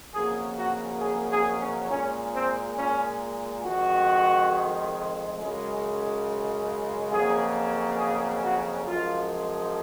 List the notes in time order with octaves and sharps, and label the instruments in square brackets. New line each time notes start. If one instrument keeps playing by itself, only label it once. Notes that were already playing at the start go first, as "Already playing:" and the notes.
[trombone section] F2 C#3 F#3 A#3 G#4
F#4
G#4
G#4
C#4
A#2 G#3 C#4
C4
C#4
F2 D#3 G#3 F#4
F#2 C#3 G#3
F2 C#3 F#3 A#3 G#4
G#4
F#4
F#2 F3 G#3 F4